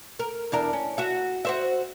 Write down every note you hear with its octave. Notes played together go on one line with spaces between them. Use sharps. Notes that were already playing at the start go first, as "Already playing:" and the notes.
A#4
E2 D4 A#4
C#4
F#4 E5
F#4 C5 E5